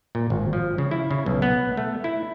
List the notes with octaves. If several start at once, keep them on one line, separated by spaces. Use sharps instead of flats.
A#2
G#1
F3
C#3
E4
C#3
B1
B3
A3
E4